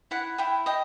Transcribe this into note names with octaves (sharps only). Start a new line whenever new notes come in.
E4 F#5
E4 G5
D#5 G5